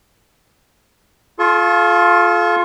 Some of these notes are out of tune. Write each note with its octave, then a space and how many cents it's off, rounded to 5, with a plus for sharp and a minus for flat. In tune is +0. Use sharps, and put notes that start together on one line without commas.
F4 +0 A4 -40 C#6 -40